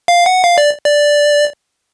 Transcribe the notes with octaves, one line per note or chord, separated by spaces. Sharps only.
F5
F#5
F5
D5
D5